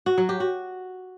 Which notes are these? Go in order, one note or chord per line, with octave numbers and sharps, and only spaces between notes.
F#4
F#3
G4
F#4